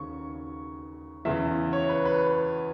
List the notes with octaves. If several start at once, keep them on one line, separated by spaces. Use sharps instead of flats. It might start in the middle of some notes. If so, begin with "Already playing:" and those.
Already playing: D#2 C#3 C#6
E2 C#3 E3 E5
C#5
B4
B4